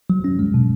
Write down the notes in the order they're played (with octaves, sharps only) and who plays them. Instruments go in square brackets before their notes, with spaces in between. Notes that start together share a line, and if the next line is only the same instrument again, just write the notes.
[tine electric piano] F#3
C#4
G#3
B2